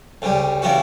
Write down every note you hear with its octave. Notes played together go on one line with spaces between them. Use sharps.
D2 C#3 G3
C#3 E3 G3 B3 F#4